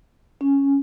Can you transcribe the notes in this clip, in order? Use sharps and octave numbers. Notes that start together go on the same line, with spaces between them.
C#4